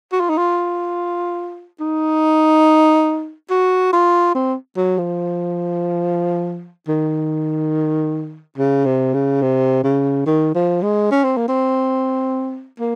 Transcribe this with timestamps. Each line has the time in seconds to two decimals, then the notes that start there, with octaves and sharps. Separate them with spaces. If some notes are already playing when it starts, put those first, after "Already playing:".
0.12 F#4
0.20 F4
0.29 D#4
0.37 F4
1.80 D#4
3.50 F#4
3.93 F4
4.35 C4
4.76 F#3
4.98 F3
6.88 D#3
8.58 C#3
8.85 C3
9.14 C#3
9.42 C3
9.84 C#3
10.26 D#3
10.55 F3
10.82 G#3
11.11 C#4
11.24 C4
11.37 A#3
11.49 C4
12.79 A#3